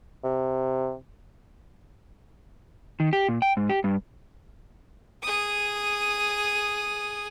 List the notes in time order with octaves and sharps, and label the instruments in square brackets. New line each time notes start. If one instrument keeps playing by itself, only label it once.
[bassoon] C3
[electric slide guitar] D#3
G4
A#2
G5
G#2
G4
G2
[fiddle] G#4 D#6